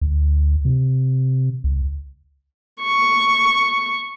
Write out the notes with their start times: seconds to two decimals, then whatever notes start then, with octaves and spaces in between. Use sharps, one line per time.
0.01 D2
0.65 C3
1.64 C#2
2.82 C#6